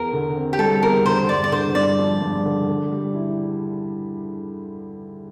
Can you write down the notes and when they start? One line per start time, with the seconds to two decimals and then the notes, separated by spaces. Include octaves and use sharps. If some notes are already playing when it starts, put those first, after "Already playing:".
Already playing: E2 A#4
0.13 D3
0.36 C4
0.53 G4
0.59 G3 A4
0.82 E2 A#4
1.06 D3 C5
1.29 G2 D5
1.44 D5
1.52 D3 C5
1.75 G2 D5
1.98 F3
2.22 G2
2.45 D3
2.68 D3
2.92 G3
3.14 E4